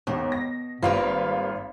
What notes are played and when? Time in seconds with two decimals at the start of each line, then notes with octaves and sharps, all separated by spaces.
0.07 D#2 G#2 B2
0.32 A#6
0.82 G#1 G3 A#3 F4 B4 F5